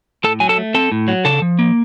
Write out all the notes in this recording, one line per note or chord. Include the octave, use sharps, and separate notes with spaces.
A2 A4 A5
F#3 G#5
A4 A5
A3
C4 A4 A5
A2
F#3
C#3 A4 A5
F3
A#3